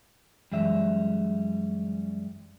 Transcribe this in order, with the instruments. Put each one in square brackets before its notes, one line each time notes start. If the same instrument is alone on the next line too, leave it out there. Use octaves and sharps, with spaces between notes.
[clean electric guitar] F#2 E3 G3 G#3 E5